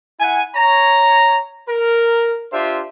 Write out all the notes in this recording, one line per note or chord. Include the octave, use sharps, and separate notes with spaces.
E4 F#5 G#5
C#5 A#5
A#4
D4 F4 G4 C5 E5